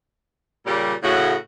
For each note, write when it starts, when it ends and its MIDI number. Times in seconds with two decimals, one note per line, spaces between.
0.66 0.93 46
0.66 0.93 49
0.66 0.93 55
1.03 1.35 45
1.03 1.35 49
1.03 1.35 57
1.03 1.35 66
1.03 1.35 78